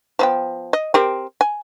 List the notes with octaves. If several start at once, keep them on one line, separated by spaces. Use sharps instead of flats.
F3 B3 G5
D#5
C4 G4 A#4
G#5